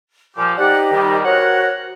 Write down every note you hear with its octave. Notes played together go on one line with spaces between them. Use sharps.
A#2 F3 G4 G#5
D#4 G4 C5 D5 F#5
D#3 G3
F#4 A#4 C5 C#5 F#5